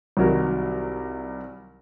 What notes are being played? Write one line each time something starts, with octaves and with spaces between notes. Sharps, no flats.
C2 D#3 F#3 A#4